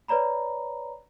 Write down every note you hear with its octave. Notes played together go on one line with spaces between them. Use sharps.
B4 C#5 D5 A#5 B5